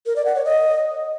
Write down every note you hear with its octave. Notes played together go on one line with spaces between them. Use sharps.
A#4
D5
F#5
C#5
D#5